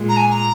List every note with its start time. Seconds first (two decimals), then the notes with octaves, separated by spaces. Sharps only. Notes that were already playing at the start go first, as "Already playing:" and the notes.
Already playing: A#2 G#3
0.09 A#5
0.17 G#5
0.30 A#5